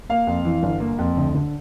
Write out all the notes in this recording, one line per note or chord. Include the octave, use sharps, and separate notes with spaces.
A#3 F5
F2
E3
G1
A#3
F2
D2
D3